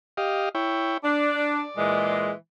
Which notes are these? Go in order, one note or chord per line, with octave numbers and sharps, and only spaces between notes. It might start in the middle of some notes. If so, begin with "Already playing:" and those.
G4 D#5 F5
E4 C#5 G5
D4 D5
A#2 E3 G#3